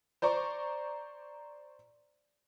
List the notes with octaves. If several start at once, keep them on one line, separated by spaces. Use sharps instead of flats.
C5 D5 A#5 C#6